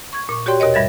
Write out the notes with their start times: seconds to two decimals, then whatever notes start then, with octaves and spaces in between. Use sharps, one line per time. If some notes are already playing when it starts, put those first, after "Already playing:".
0.13 C#6 G#6
0.29 A#2 C#6
0.46 F#4 G4 C#5 D5 G5 C6
0.60 D#2 B2 A#4 C#5 D#5
0.74 G2 G3 E5 G#6 A6